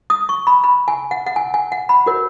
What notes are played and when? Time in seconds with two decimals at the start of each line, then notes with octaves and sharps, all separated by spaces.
0.10 D#6
0.29 C#6
0.47 B5
0.64 B5
0.88 G#5
1.11 F#5
1.27 F#5
1.36 G#5
1.54 G#5
1.72 F#5
1.89 B5
2.06 F#4 A#4 C#5